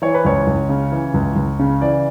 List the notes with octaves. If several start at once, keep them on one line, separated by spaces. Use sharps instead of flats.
E3 C#5
B4
C#2 C#5
C#2
C#3
E3
C#2
C#2
C#3
E3 D5